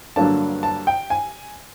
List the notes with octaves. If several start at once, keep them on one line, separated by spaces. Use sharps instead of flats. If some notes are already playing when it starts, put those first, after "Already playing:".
G2 D3 F#3 A#3 D4 A5
A5
G5
G#5